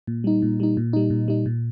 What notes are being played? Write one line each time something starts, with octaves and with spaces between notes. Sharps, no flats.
A#2
G3 D#4
A#2
G3 D#4
A#2
G3 D#4
A#2
G3 D#4
A#2